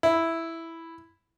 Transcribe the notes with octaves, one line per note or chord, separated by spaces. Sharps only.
E4